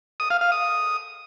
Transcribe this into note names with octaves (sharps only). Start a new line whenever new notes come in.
D#6
F5
F5
D#6